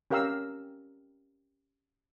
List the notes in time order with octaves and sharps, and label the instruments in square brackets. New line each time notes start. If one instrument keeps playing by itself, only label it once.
[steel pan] C#4 G4 A#4 F5 A#5 E6